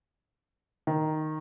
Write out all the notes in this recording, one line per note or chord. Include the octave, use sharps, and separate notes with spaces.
D#3